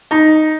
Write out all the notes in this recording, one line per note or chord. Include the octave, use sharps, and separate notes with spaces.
D#4